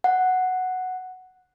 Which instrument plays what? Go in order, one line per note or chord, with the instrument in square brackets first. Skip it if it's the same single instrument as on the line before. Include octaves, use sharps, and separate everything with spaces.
[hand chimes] F#5